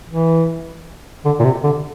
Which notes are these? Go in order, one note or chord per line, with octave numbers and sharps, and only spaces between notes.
E3
D3
A#2
C3
D3